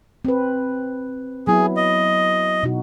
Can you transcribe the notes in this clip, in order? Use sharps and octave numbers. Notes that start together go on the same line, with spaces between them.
C4 B4
F#3 B3 E4 G#4
D#5
B2 D#4 F#4